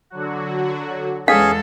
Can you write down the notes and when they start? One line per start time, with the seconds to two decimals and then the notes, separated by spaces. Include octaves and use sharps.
0.10 D3 F#3 F#4
1.28 E2 G#3 C#4 G#4 A4 F5 G#5